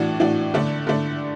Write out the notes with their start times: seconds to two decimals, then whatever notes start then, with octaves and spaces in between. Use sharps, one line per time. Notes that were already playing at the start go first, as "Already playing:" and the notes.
Already playing: A2 E3 D4 F#4
0.20 A2 E3 D4 F#4
0.54 D3 A3 D4
0.87 D3 A3 D4